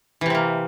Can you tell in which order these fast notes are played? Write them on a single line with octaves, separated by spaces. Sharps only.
E3 C3 C4 A#3